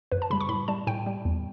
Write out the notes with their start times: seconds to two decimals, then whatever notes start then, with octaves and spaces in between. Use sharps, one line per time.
0.12 F#2 B4
0.22 A5
0.30 C#3 G3 B5
0.41 C#6
0.49 A2 B5
0.68 G3 A5
0.87 A2 G5
1.06 G3
1.25 E2